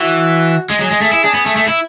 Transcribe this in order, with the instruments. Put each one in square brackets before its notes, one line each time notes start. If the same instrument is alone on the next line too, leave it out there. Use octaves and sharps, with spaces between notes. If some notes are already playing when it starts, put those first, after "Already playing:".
Already playing: [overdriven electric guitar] E3 [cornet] F#4
[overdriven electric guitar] G#3
[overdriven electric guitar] F#3 [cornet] G#4
[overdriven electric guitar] G#3
A3
E4
[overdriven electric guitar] D4 [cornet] G#4
[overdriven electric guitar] B3
A3
A3
E4